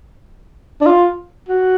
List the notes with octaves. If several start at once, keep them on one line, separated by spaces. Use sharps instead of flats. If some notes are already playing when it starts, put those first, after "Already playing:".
D4
F4
F#4